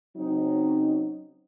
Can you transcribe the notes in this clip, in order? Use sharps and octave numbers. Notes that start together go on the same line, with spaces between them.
C#3 F#3 C4 C#4 D#4